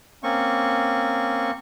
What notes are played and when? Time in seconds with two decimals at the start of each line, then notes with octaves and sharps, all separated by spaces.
0.23 A#3 C4 C#4 C#6